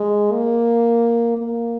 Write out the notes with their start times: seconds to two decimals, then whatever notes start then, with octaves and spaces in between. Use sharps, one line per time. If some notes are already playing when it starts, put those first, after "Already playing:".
Already playing: G#3
0.32 A#3
1.37 A#3